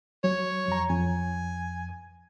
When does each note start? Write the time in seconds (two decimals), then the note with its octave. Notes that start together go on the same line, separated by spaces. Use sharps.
0.24 F#3 C#5
0.68 F2 A#5
0.90 F2 G#5